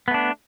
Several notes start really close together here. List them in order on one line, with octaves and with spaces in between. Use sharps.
B3 A3 D4